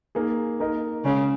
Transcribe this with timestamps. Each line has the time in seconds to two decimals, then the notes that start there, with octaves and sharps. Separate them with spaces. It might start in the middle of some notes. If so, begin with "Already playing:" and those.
0.15 A#3 D#4 G#4
0.60 A#3 D#4 A#4 D#5
1.05 C#3 G#3 C#4 G#4 C#5